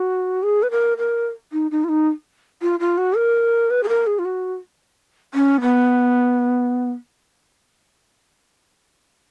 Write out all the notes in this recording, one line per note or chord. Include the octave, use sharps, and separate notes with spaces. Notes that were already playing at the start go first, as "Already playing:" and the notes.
Already playing: F#4
G#4
B4
A#4
A#4
D#4
D#4
F4
D#4
F4
F4
F#4
A#4
B4
G#4
A#4
G#4
F4
F#4
C#4
B3